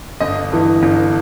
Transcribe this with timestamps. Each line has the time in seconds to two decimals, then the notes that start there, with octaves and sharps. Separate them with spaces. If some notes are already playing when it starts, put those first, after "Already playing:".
0.20 G1 D#5
0.52 G2 E3
0.83 G1